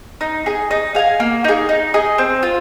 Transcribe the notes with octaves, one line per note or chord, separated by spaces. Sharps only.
D#4
G#4 D#5
D#4
G#4 F5 G#5
A#3
D#4 G#4
D#4
G#4 D#5
C4
F4